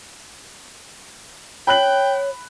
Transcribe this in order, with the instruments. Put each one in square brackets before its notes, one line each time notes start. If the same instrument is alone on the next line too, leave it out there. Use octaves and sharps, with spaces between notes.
[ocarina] C#5 [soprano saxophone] G5 [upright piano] B5 F#6 F#7